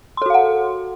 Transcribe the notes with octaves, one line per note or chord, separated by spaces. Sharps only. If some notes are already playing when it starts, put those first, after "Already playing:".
F#4 A4 F5 F#5 C6